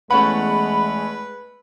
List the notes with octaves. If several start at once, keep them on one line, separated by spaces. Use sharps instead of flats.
E2 G#3 A3 C#4 B4 F#5 B5